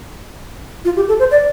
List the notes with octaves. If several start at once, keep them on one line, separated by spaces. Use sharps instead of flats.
F4
G4
A4
C5
D5